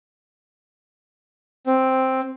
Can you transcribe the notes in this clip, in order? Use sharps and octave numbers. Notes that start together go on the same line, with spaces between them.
C4